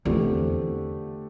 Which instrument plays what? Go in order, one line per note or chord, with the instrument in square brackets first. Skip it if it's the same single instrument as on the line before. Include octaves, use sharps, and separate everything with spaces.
[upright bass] E2 [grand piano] D3 A3 C4 G4